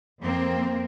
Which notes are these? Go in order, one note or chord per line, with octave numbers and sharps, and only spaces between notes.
F2 A#3 C4